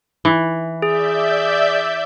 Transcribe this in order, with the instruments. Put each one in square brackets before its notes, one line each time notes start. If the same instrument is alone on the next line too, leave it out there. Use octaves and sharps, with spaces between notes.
[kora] E3
[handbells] G#4 [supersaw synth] D5 E5 G6